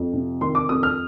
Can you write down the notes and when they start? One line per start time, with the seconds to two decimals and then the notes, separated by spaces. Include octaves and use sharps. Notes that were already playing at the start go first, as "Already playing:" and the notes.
Already playing: F2
0.13 C3
0.41 D#3 C6
0.55 D6
0.69 F2 D#6
0.83 F6